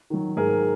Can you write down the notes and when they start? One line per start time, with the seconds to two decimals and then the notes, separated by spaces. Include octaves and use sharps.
0.10 D#3 F#3
0.36 G#2 G#4 A#4